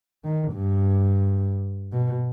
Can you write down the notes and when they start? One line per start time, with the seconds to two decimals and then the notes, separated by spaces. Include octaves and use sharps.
0.24 D#3
0.52 G2
1.92 B2